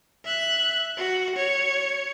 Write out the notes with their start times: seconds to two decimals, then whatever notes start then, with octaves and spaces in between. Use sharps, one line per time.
0.25 E5 F#6
0.97 F#4
1.36 C#5